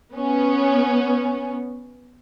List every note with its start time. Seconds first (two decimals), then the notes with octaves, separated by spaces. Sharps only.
0.13 B3 C#4